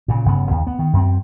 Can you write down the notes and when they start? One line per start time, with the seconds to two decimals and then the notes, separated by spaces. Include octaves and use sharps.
0.08 A#2 C#3
0.25 G1 C#3 B3
0.51 D#2
0.67 B3
0.79 D#3
0.93 F#2 C4